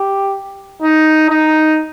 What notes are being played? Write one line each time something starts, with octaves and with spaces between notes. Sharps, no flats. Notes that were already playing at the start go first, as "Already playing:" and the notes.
Already playing: G4
D#4
D#4